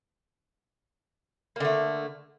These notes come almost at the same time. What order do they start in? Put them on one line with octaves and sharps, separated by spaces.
A#3 D3 A3